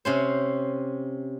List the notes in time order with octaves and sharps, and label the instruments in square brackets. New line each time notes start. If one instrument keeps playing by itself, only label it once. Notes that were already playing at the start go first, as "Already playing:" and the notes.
[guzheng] C3 C#4 C5